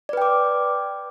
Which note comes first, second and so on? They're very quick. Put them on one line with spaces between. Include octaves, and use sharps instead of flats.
D5 B4 G5 D6